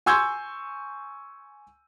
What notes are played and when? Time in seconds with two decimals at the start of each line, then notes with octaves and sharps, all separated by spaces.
0.06 G#5 C6 C#6 E6 G6 G#6